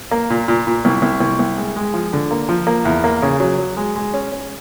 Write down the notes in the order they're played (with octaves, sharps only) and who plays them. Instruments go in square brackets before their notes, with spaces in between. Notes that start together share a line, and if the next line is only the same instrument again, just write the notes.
[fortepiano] A#3
A#2
A#2
A#2
C2
C2
C2
C2
G#3
G#3
F3
D3
A#3
F3
A#3
E2
A#3
C#3
F#3
F#3
G#3
G#3
C#4
C#4